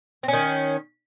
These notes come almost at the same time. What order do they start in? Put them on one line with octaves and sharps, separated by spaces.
C4 C#4 D#3